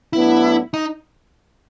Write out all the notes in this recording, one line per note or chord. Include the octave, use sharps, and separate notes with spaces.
A2 F#3 B3 D4 E4
D#4